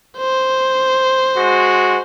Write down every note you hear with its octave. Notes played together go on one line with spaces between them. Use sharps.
C5
G#3 F#4